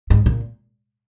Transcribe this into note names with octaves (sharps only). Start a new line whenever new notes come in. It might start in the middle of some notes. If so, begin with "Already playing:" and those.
G#2
A#2